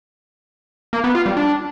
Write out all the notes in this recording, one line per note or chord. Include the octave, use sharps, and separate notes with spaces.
A#3
B3
F4
G3
D4